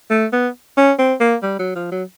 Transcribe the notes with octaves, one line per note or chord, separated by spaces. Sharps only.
A3
B3
C#4
C4
A#3
G3
F#3
F3
F#3